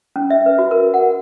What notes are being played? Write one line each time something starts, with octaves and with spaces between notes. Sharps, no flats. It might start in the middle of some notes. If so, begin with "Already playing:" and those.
C#4
E5
B4
F#4
A#4
F#5